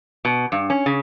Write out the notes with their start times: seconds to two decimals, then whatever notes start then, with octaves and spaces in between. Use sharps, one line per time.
0.25 B2
0.52 G2
0.70 C#4
0.86 C#3